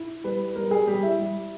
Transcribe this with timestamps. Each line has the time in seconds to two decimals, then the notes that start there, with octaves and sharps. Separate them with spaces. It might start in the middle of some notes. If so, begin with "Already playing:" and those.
Already playing: E4
0.24 G3 B4
0.56 G3 A#4
0.71 G#4
0.87 G3 G4
1.03 E4
1.19 G3